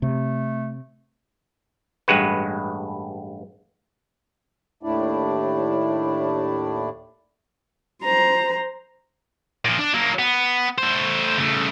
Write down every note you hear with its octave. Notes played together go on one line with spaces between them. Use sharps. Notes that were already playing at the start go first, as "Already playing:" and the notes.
C3 A3
A1 G2 G#3 F#4 B4
D#2 A2 A3 D4 E4 D5
C5 A#5
A#2 F3
D4
F#3 A#3
B3
A3 C5
C#3 A3